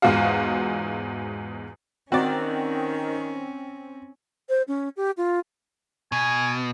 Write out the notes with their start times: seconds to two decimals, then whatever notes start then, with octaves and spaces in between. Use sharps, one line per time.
0.02 E2 G#2 F4 F#4 F5
2.12 D#3 C4 C#4 F#4 D5
4.49 C5
4.68 C#4
4.97 G4
5.17 F4
6.12 B2 G#5